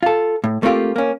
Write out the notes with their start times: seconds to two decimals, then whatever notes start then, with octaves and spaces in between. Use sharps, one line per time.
0.03 F4 A4
0.44 A2
0.63 A3 A#3 C4 F4 G4
0.96 A#3 C#4